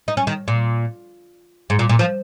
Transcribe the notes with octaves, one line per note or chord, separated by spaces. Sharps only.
D#4
C#4
D#3
A#2
G#2
A#2
A#2
F3